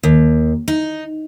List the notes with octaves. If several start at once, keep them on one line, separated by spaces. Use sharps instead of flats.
D#2
D#4